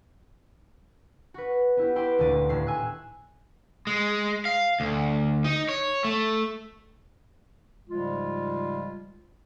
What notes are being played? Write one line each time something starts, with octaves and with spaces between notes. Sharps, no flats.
F#4 B4
B3 E4 G4
E4 B4 G5 C6 D6
D#1 D2 D3 D5 D#7
D#1 A2 E5 C7
G#5 E6 F#6
G#3
F5
D2
D#4
C#5
A3
G#2 C#3 F3 G3 G#3 F4